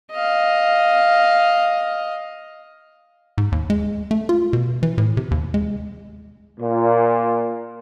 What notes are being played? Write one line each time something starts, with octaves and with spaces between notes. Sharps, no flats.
D#5 F5
G#2
D#2
G#3
A3
F4
B2
E3
A2
C3
D#2
G#3
A#2